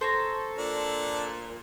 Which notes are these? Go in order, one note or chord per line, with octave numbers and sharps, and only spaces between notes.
A4 C5 C#5 A#5
A#2 D4